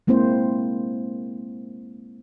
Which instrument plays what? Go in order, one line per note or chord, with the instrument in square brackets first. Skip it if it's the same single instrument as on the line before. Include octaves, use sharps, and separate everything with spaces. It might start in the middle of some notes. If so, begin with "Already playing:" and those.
[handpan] G#3 A#3 C4 E4 C5